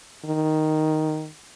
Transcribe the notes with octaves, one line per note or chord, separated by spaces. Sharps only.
D#3